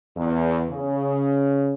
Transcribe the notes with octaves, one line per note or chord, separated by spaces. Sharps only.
E2
C#3